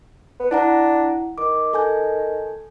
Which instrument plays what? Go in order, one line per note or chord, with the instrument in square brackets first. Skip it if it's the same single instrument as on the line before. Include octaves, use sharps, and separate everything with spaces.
[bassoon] B3
[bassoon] D4 [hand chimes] E4 F#5 A#5
[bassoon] D#3 [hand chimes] D6
[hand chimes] A4 G#5 G6